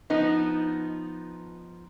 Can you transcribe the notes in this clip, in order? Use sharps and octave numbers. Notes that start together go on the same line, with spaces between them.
F3 B3 D#4